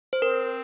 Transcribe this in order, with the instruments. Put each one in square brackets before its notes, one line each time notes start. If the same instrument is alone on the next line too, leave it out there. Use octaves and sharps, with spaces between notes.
[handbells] C5
[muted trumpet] C4 [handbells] A#4